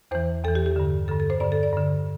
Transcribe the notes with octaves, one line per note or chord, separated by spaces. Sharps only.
E2 E3 C5
E2 E3 A4
G4
G4
G2 D3
G2 D3 A4
A4
C5
G2 D3 D5
A4
D5
G2 D3